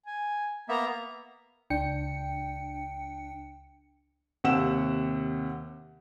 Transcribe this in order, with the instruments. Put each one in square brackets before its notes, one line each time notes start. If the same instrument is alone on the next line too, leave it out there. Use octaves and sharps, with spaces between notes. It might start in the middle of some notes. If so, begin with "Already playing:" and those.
[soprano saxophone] G#5
[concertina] A#3 B3 E5 [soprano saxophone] A#5
[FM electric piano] C#2 D4 G5 C#7
[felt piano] D#2 C3 G4 F#5 E6 E7